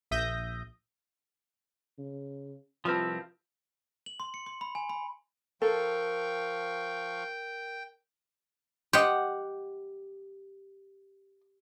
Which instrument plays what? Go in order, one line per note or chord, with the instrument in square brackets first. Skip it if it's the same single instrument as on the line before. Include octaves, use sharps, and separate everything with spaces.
[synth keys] A#1 E5 D#6 G6 A#6
[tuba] C#3
[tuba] C2 [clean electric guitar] F3 C4 [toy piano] F4 B4 A5 [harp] E5 F5
[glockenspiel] F#7
C6
C#7
C6
B5
G#5
B5
[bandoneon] F3 F5 C#6 [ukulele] A4 [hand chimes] A#4 [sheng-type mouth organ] G5
[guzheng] G4 F#5 [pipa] D#5 C6